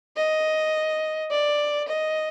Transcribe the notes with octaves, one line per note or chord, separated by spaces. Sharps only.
D#5
D5
D#5